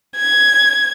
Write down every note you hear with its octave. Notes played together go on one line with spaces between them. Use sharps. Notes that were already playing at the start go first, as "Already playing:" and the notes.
G#6